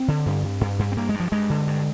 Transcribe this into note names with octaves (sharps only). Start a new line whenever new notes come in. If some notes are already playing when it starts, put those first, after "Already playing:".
Already playing: C4
D3
G2
G2
G2
G2
C4
G2 A#3
G2 G#3
F3
G2 G#3
D3
G2